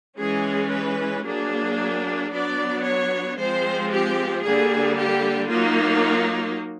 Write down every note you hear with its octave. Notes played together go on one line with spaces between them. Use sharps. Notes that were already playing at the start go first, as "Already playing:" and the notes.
E3 G#3 C#4 G#4
B4
F#3 A#3 D4 G#4
F#3 B3 D4 D5
C#5
F3 G#3 C4 C5
G4
D3 G3 A#3 G#4
G4
F#3 A#3 D#4 F4